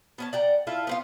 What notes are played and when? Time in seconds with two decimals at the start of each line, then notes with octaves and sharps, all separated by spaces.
0.18 B3 C#4 A5
0.33 D5 F#5 G5 A#5
0.67 E4 F4 A4
0.87 B3 C4 F4